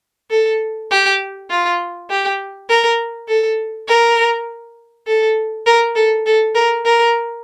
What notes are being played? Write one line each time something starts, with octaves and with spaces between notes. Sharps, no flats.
A4
G4
F4
G4
A#4
A4
A#4
A4
A#4
A4
A4
A#4
A#4